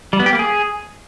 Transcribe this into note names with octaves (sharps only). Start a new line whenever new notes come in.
G3
B3
G4
A#3
G#4